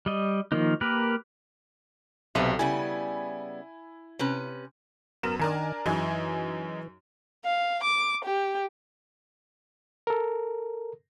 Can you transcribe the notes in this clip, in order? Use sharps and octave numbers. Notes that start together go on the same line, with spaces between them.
G3 D#5
D#3 F3 A#3 D#4
A#3 G4 A#4 B4
B1 C3 A4 B4 E5
C#3 G3 B3 E4 G#5
C3 C#4 B4
F#2 B3 A#4 E7
D#3 D4 A#4 G#5
F#2 E3 D#4 G#4
F5
D6
G4
A4 A#4